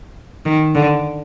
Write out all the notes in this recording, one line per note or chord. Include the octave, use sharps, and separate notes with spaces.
D#3
D3